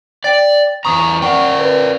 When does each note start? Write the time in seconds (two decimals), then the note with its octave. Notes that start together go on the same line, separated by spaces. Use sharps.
0.24 D5 G5 A6
0.85 E2 G#2 A#5 C#6 D#6
1.22 A#4 D5 F#5 G5 C#6
1.59 B4